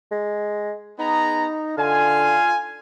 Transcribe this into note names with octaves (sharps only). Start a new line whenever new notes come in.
G#3
B3 D#4 G#4 A#5
D3 F4 F5 G#5